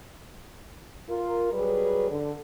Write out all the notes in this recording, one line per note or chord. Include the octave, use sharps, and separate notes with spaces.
F4 A#4
F#3 G3 G#4 B4
D3